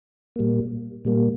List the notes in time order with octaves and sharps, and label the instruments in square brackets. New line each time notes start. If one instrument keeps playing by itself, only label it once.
[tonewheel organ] A#2 G3 A#3
A#2 G3 A#3